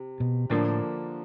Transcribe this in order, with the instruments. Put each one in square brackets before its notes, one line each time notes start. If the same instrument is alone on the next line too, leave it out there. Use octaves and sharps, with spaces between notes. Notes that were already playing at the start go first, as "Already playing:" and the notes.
Already playing: [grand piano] C3
[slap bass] B2
[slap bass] A2 [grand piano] D3 F3 A#3 D4